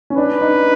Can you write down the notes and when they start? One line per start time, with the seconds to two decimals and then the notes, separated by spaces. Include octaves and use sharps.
0.10 C#4
0.17 D4 B4
0.41 D#4